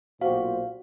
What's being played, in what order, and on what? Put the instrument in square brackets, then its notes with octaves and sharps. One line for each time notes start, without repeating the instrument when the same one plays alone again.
[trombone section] B1 A#2 C5 [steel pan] F#4 G4 [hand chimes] F5